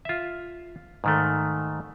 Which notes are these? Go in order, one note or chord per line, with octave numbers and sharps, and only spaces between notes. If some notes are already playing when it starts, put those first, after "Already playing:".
F4 E5
G#2 D#3 A3